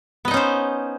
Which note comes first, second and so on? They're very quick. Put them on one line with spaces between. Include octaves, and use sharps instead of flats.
B3 D#5 D#4 C#4 C5